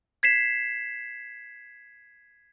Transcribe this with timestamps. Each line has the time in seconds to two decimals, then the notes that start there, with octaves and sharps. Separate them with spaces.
0.23 G#6 B6 C7 E7